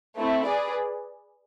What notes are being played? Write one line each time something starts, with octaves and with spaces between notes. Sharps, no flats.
A3 C4 E4
G#4 B4 D5